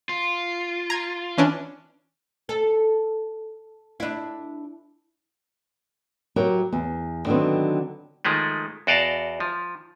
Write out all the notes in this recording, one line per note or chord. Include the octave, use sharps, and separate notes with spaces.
F4
A#5 G#6
E3 C#4 D4
A4
D4 E4
F#3 E4 G4 A#4
E2
D3 D#3 F#3 B3 C4
D#3 F3 G#3 A3
E2 F#4 D5 D#5 F5 A5
F3